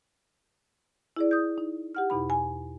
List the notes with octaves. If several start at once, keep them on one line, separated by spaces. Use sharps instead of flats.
E4 G#4 D5
D#6 G6
D#4
G4 F#5 F6
E2 B2 D#4 B5
G#5